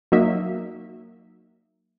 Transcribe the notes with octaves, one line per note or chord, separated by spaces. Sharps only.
F#3 A#3 D#4 E5